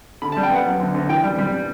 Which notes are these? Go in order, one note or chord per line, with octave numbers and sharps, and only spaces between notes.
D3 B5
A5
G3
G5
B3 F#5
F#3
D2
D2
E3 G5
G3
G3